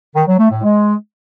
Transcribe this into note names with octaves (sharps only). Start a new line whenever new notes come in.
D#3
F#3
A3
A2
G#3